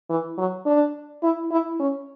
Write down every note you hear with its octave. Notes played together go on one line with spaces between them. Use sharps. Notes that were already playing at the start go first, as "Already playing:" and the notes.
E3
F#3
D4
E4
E4
C#4